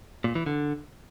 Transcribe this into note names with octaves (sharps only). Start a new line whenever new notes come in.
A#2
E3
D3